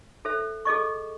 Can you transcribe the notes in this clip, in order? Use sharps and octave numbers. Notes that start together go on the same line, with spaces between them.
A4 C5 E5
G#4 A4 D#5 C#6